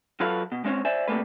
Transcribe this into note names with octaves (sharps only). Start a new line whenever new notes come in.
F#3 F4 A4 B4 C#5 F5
B2
G#3 C4 C#4 C#5
C5 D5 E5 G#5
C3 G3 A3 A#3 B4